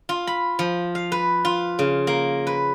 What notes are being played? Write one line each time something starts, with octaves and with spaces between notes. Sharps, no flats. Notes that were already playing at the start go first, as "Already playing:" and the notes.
F4
B5
F3
F5
B4
F4
C#3
A#3
B4